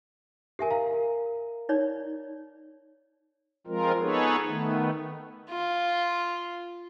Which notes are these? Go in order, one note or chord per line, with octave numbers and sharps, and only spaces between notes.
G4 A4 A#4 E5 G#5
A#4 F5 A#5
D#4 C#5 D5
F3 G#3 C4 F4 A#4
B3 D#4 G#4 A4 B4 C#5
D#3 A3 B3
F4